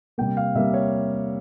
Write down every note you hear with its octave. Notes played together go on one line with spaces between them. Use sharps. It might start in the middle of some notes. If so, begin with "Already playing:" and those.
C3 G3 A#3 G5
F5
C3 G3 A#3 E5
C#5